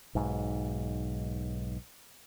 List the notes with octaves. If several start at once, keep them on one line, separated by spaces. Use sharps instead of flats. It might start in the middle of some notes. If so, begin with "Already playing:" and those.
B1 G#2